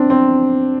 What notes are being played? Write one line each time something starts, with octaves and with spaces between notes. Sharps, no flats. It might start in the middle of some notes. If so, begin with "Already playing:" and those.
Already playing: C4 D4
C4